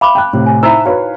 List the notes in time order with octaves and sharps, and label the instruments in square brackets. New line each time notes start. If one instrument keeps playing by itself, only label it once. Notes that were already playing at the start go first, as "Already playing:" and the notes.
[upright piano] E5 [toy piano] F5 B5 D6
[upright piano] G5 A5 F#6
A2 C3
[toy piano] G#5
[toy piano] D#4 E4 C5 [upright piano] E5 B5 E6
[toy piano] F#4 [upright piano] B4 C#5 F5